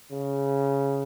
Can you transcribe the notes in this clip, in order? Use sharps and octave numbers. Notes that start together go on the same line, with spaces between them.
C#3